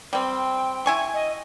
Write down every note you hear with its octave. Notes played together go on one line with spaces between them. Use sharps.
G3 C4 G5
E4 G#5 C#6
D#5